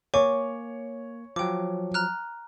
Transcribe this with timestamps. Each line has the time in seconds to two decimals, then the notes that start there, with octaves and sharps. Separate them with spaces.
0.14 A#3 C#5 G#5 C#6 D6
1.36 F3 F#3 G5 D6
1.94 A#5 F6 F#6